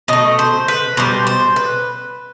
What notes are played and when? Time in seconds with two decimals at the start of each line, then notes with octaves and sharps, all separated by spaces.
0.08 B2 A3 D#5
0.39 C5
0.68 B4
0.97 B2 G3 C5
1.27 C5
1.56 B4